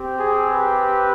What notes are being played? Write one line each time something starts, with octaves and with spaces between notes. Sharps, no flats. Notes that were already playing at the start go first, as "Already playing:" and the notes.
Already playing: C4 G4
G#4
B4